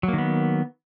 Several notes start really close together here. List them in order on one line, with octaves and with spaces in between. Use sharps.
F#3 A#3 D#3 B3